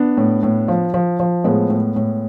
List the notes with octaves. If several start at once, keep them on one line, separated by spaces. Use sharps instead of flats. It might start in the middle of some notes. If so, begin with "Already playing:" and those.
Already playing: B3 D4
A2
A2
F3
F3
F3
A2 G#3 B3
A2
A2